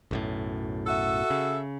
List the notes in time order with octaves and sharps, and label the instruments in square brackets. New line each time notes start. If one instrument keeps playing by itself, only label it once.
[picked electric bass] B1 F#2 A2
[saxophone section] F#4 A4 E5
[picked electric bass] C#3